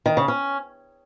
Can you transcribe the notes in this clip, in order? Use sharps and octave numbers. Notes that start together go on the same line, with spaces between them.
D#3
C#3
C#4